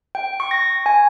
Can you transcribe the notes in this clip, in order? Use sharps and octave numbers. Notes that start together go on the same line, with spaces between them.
G5
C#6
A#6
G#5